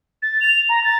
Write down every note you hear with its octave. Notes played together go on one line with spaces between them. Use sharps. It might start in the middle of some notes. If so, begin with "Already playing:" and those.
A6
F7
A#5
A6